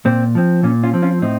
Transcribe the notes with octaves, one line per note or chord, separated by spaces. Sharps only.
A#2 C4
F3 C4
A#2 C#4
C#4 F4
F3 C4
C#4 F4
A2 C4 D#4